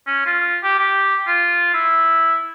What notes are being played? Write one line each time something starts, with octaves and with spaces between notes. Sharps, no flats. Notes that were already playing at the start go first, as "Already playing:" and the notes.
C#4
F4
G4
G4
F4
E4